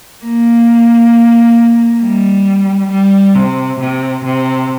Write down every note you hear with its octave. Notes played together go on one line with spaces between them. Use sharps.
A#3
G3
G3
C3
C3
C3